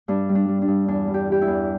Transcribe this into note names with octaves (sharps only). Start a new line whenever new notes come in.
G2 D4
G3
D4
G3
D4
G2
E2 D4
G3
G4
E3 G4
E4
E2